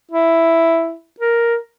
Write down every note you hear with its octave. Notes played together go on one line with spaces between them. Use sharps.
E4
A#4